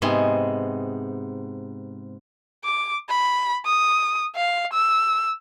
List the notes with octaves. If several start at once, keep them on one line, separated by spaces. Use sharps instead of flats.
G#2 C3 B3 G#4 G#5 C6
D6
B5
D#6
F5
E6